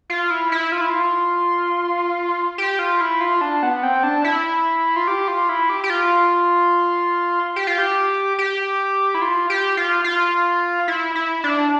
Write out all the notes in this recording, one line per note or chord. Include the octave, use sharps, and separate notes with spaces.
F4
E4
E4
F4
E4
F4
G4
F4
E4
F4
D4
B3
C4
D4
E4
F4
G4
F4
E4
G4
G4
F4
G4
F4
G4
G4
E4
F4
G4
F4
F4
E4
E4
D4